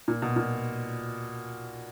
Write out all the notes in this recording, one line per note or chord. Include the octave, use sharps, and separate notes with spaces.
A#2
B2
A#2